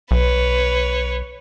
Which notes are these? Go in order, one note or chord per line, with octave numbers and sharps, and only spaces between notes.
B1 B4 C#5